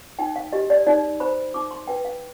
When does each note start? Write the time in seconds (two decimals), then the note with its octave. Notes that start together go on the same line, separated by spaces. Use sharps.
0.19 D#4 G5
0.36 F5
0.53 G4 D#5
0.70 D5
0.87 D#4 D5
1.20 C5 B5
1.54 D#4 D6
1.71 C6
1.87 B4 G5
2.05 F5